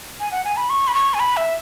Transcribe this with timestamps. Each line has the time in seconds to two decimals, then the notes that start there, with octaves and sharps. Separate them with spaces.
0.20 G#5
0.32 F#5
0.44 G#5
0.57 B5
0.70 C#6
0.88 B5
0.95 C#6
1.14 G#5
1.20 B5
1.37 E5